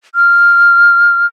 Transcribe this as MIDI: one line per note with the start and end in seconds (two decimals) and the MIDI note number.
0.15 1.26 89